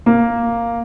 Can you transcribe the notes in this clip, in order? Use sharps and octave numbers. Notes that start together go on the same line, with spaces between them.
A#3